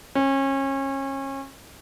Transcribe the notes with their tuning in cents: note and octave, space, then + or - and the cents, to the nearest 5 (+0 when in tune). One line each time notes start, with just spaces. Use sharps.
C#4 -30